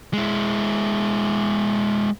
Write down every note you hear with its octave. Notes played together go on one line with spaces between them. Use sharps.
G#3 E4